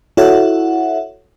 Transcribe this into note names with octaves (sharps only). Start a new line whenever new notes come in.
E4 F#4 A4 C#5 E5 F#5